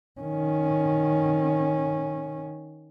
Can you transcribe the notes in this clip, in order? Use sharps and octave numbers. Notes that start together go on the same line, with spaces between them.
D#3 C#4